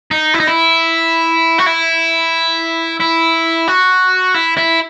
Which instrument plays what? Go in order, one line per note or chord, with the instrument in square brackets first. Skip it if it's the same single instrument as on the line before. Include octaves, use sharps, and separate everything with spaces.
[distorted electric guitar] D#4
E4
D#4
E4
F#4
E4
E4
F#4
E4
E4